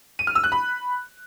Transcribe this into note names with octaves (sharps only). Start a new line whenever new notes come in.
D#7
F6
E6
F#6
B5